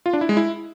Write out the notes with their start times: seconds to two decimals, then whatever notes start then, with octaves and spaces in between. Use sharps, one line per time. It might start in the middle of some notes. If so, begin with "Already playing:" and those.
0.06 F4
0.13 D4
0.21 E4
0.29 G#3
0.37 E4